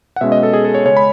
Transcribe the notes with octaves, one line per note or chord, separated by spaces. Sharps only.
F#5
B2 G#3 C#4 E5
D#5
A4
G#4
A4
C#5
C#3 G#3 C#4 C#5
B5